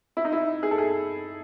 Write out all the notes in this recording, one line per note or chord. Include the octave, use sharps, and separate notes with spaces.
E4
D#4
E4
G#4
A4
G#4